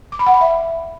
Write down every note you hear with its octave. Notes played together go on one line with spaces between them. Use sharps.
D6
B5
F#5
B5
E5